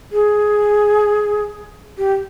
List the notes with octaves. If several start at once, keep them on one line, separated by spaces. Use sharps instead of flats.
G#4
G4